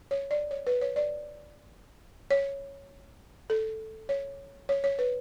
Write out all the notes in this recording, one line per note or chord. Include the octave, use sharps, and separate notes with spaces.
C#5
D5
C#5
B4
C#5
D5
C#5
A4
C#5
C#5
C#5
B4